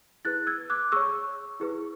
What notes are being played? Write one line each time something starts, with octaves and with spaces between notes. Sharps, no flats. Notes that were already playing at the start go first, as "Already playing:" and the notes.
E4 G#4 B4 F#6 A6
E6 G#6
D6 F#6
G#4 C#5 C#6 E6
E4 G#4 B4